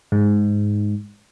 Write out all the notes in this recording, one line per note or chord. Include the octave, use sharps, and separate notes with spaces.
G#2